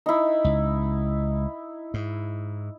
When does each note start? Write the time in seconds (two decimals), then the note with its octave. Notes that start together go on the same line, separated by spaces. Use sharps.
0.06 D#4 E4
0.44 C#2
1.94 G#2